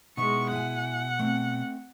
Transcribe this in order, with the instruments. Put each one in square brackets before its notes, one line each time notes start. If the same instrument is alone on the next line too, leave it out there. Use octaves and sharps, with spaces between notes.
[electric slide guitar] B2 [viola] G#3 C#6 [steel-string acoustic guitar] B3 D#4 E4
[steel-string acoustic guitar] E4 G#5 [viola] F#5
[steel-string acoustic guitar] A3 C4